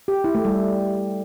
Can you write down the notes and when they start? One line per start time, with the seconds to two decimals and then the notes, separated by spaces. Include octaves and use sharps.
0.08 G4
0.24 E4
0.35 A3
0.45 G3